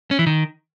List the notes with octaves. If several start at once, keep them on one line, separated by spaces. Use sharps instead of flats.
C#4
E3
D#3